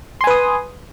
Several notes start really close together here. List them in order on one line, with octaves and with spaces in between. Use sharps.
C6 G#5 B4 D#6